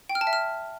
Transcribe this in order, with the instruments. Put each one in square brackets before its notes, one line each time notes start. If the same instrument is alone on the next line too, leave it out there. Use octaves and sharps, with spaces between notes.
[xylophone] G5
F6
A5
E5
F6